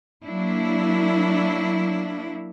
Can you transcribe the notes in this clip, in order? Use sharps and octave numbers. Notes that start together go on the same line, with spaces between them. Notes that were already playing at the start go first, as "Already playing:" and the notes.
F#3 A#3 D4 E4